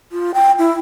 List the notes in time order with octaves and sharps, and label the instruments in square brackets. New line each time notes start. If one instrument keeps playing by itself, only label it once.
[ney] F4
G5
E4